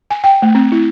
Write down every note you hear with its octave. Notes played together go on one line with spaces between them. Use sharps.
G#5
G5
A3
C4
E4